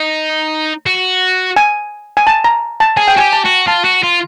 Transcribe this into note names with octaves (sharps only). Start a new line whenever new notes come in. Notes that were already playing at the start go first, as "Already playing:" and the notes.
Already playing: D#4
F#4
G#5
G#5
A5
A#5
A5
G#4 G#5
G5
F#4 G4 G#5
A5
F#4
F4 A5
F#4
F4